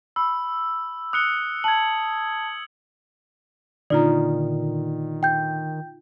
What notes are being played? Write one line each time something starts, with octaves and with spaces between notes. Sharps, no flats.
B5 E6
D#6 F#6 C#7 G7
A5 G#6 F#7
A#2 D3 D#3 D#4 F4 D5 A#5
G5 G6